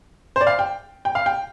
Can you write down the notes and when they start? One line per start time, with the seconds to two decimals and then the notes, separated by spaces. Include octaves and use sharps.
0.36 C5
0.41 D5
0.47 F5
0.59 G5
1.05 G5
1.15 F5
1.26 G5